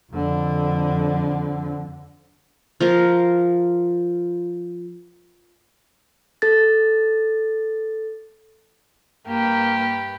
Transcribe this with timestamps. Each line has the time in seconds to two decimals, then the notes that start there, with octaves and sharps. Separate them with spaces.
0.12 F2 D3
2.81 F3 F4 A#4
6.42 A4 A6
9.27 G2 A#3 G4 B4